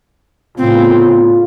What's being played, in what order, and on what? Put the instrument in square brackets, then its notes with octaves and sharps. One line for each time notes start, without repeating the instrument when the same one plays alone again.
[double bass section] A2 C#3 B3 [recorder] C4 [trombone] F4